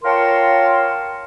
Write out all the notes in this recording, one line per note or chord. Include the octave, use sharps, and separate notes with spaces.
F4 A#4 C#5 G5 A5 C6